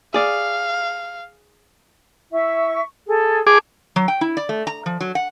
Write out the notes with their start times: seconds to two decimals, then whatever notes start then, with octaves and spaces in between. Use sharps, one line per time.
0.14 G#4 D5 F5
2.31 E4 E5 C#6
3.06 G#4 A4
3.47 G#4 A5 D6
3.96 F#3
4.08 G5
4.21 E4
4.37 D5
4.49 A3
4.67 A#5
4.86 F3
5.00 F#3
5.15 F#5